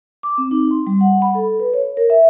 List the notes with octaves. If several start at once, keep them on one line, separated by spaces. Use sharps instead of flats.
D6
C4
D#4
C6
G3
F#5
B5
A4
B4
C#5
A#4
E5